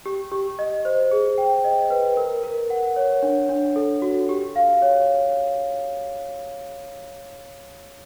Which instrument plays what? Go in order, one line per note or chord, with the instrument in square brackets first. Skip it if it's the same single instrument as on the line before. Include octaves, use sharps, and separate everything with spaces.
[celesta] G4
G4
D#5
C5
G#4
G5
D#5
B4
A#4
A#4
F#5
C#5
D4
D4
A4
F#4
G4
F5
C#5